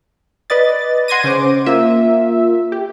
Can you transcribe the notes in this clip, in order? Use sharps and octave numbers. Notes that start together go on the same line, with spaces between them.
B4 D5 D#5 A6
F#5 C6 G#6 A#6 D#7
C#3 C#4 C5 D6
A#3 F4 E5
G4